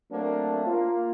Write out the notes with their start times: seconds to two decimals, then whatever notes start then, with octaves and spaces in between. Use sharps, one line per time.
0.11 F#3 A3 A#3 C4 D4
0.66 A#3 F4